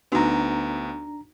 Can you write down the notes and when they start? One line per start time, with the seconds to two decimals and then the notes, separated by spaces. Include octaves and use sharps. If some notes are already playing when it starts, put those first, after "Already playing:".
0.12 D2 B3 D4 D#4 F#4 G#5 A#5